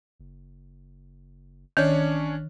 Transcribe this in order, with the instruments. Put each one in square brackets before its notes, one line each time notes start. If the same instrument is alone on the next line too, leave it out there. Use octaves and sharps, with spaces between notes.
[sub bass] F#1
[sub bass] A1 [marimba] D#3 [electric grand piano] C#4 D4 C#5